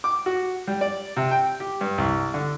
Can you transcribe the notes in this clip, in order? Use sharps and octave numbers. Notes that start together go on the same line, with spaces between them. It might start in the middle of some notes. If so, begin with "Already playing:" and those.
D6
F#4
G3
D5
C3
G5
G4
G2
C2
D3